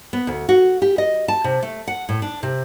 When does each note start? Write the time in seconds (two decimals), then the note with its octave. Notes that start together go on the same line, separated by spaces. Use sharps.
0.13 B3
0.27 D2
0.49 F#4
0.82 G4
0.98 D#5
1.28 A5
1.44 C3
1.62 A3
1.88 F#5
2.09 A2
2.22 D4
2.43 C3